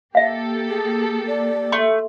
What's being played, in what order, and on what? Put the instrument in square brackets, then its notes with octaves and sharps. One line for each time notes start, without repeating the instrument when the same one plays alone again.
[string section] A#3 G4 A4 [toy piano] E5 F5
[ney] G#4
D5
[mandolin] A3 [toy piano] C6